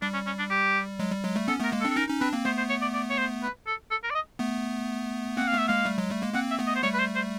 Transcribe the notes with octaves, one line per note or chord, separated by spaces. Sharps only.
G3 D4
C#4
C#4
D4
G4
F#3 G#3
G3
F#3 G#3
G3 A3
B3 C#4 A4
A3 B3 A#4
G#3 A#3
A4
C4 D4
A4
C#4 D#4 A#4
C#4 D#4
C4 D4 B4
A#3 C4
A3 B3 C5
C5
C#5
D5
D5
C#5
C5
B4
A4
A4
A#4
D5
D#5
A3 B3
A#3 C4 F#5
F5
A3 B3 E5
G#3 A#3 F5
G3 A3
F#3 G#3
G3 A3
G#3 A#3
A#3 C4 F#5
E5
A3 B3
D#5
C5
G3 A3 C#5
B4
C5
C5